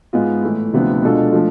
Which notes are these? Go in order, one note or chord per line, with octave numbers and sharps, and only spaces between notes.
G#2 G#3 B3 F4
A2 E3 A3 E4
D2 C3 F3 B3 D4
B2 G#3 D4 F4 A4
F3 A3 D4